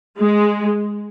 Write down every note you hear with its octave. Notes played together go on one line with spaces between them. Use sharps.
G#3